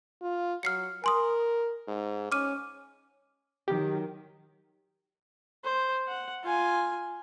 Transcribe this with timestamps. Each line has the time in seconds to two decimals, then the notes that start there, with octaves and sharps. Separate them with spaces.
0.22 F4
0.63 F#3 F6 C7 C#7
1.04 A#4 G#5 C6 D#6
1.88 G#2
2.32 C#4 D6 F6 D#7
3.68 D#3 F#3 G4
5.64 C5
6.08 F#5
6.44 F4 G#5